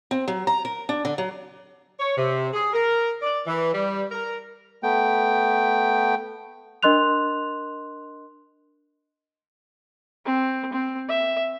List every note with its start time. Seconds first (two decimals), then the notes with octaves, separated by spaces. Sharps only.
0.11 C4
0.28 F#3
0.47 A#5
0.65 A#4
0.89 D4
1.05 D3
1.18 F#3
1.99 C#5
2.18 C3
2.53 G#4
2.73 A#4
3.22 D5
3.45 E3
3.73 G3
4.11 A#4
4.83 A3 B3 G5
6.83 D4 A#4 D#5 C6 F#6 F7
10.25 C4
10.73 C4
11.09 E5